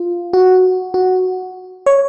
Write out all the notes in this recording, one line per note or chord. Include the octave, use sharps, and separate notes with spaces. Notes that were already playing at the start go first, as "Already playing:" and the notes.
Already playing: F4
F#4
F#4
C#5